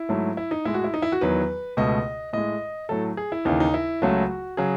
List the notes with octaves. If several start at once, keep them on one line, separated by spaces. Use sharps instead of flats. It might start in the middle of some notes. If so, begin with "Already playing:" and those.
Already playing: E4
G#2 F#3 A3
E4
D#4
A2 G#3 E4
F#4
E4
D#4
E4
F#4
E2 D#3 F#3 B4
C#2 B2 A3 D#5
A2 G#3 D#5
A2 F#3 A3 A4
G#4
E4
D#2 C#3 E3 D#4
D#4
E4
C#2 C#3 F#3 A3 F#4
C#3 F#3 G#4